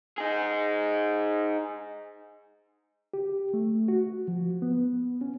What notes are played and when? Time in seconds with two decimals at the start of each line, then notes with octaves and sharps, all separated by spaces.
0.18 D#4 G#4
3.14 G4
3.54 A3
3.88 F#4
4.28 F3
4.62 B3
5.21 C#4